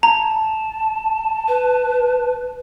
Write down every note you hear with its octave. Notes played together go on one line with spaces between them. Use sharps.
A5 A#5
B4